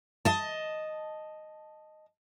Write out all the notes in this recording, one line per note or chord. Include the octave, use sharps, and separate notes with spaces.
D#5 A5